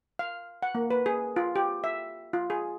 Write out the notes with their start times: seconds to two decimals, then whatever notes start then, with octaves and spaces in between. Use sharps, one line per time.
0.19 F5
0.63 F#5
0.75 A#3
0.91 B4
1.06 G#4
1.36 F4
1.56 G4
1.84 E5
2.33 F4
2.50 G#4